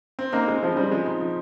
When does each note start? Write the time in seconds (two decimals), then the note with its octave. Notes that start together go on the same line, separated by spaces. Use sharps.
0.19 C4
0.32 A#3 D#4
0.48 G#3 C4
0.62 C#3 F3
0.76 G3 C4
0.91 F3 G#3
1.06 D#4
1.20 F3